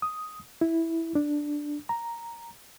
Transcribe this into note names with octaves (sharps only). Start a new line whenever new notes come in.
D#6
E4
D4
A#5